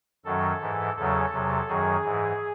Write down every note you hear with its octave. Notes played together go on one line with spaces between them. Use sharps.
F#2 D#3 F#3 A4
G#2 E3
E2 C#3 F#3 A4
E2 C3 F#3
F#2 D#3 F#3 G#4
G#2 E3